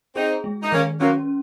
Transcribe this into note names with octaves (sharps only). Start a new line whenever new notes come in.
C4 D#4 G#4
G#3
D#4
D#3 A#3 C#4
F#3 A#3 C#4